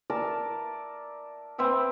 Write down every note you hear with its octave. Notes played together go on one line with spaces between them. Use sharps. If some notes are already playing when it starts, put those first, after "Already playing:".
A#4 D5 E5 A5
C4 B4 E5 G5